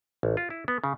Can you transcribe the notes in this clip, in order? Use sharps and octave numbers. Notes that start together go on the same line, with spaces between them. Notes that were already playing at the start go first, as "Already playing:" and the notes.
A1
F4
E4
B3
C#3